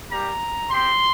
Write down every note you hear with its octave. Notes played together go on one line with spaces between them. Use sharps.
G3 A#3 G4 A#5
C4 G4 C6